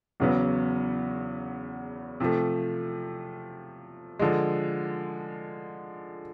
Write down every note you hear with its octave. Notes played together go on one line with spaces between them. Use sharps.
E2 C#3 F#3 B3
C3 F3 A3
D3 F3 G#3